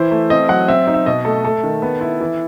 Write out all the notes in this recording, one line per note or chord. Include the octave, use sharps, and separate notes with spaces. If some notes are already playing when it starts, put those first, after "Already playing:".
Already playing: E3 E4 C5
A3
C4 D#5
F#3 F#5
C4 E5
D#4
E5
B2 D#5
A3 A4
A3 A4
D#3
B3
E4
E3